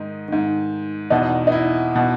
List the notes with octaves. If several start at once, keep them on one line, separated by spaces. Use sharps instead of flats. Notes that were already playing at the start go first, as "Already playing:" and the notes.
Already playing: G#2 D#3 D#4
G#2 D#3
E2 B2 D#4
D#4
E4
B2